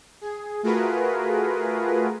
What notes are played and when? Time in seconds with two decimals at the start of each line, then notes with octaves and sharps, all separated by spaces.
0.21 G#4
0.63 A3 F4 F#4 G#4 A#4 B4